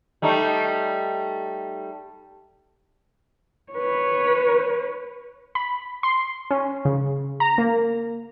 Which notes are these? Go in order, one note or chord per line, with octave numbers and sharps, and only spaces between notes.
G3 A3 D#4
B4 C#5
B5
C6
C#4
C#3
A#5
A#3